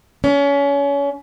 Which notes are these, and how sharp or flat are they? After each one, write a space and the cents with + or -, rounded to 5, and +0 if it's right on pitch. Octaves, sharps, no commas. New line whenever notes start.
C#4 +30